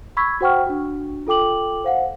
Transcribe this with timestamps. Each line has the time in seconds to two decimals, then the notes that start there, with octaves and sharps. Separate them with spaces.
0.17 B5 C#6 E6 G#6 B6
0.41 F#4 C5 F#5 G5 C#6 F6
0.66 D4 F#4
1.27 F4 A4 G5 D6 F#7
1.84 C5 F5 F#5